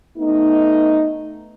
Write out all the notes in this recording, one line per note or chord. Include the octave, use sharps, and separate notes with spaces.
A3 B3 D#4